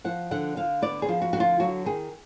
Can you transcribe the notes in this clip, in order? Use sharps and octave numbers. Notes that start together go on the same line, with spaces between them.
F3 F#5
D3 F#5
D3 F5
B3 D5
G#4
F3
F#4
D3 F#4
F4
F#3 F#4
D#3 G#4